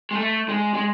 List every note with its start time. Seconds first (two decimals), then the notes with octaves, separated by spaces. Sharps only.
0.11 G#3
0.15 A3
0.49 G#3
0.74 G#3